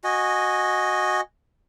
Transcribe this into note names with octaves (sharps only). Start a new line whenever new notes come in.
F#4 D#5 G#5